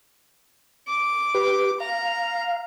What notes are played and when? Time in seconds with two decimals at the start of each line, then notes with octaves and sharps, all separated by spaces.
0.89 D6
1.34 G4 B4
1.80 F5 A#5